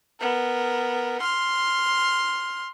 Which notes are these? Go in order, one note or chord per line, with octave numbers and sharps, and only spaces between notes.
B3 A#4
C6 F6